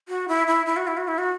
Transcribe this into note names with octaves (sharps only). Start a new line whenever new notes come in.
F#4
E4
E4
E4
F#4
E4
F#4
E4
F#4